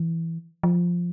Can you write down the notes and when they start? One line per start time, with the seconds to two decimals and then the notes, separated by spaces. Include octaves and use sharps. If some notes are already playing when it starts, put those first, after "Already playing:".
Already playing: E3
0.63 F3